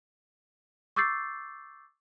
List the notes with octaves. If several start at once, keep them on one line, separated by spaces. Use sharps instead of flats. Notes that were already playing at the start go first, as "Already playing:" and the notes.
C#6 D6 E6 G6 A6 C7